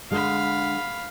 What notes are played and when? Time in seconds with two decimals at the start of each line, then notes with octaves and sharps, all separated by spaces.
0.11 D3 G#3 F5 B5